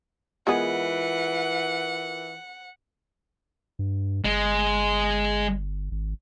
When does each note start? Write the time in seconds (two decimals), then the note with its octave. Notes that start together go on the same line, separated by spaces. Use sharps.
0.47 E3 G#3 B3 F4 G#4 A#4 F#5
3.79 G2
4.25 G1 G#3
5.91 G#1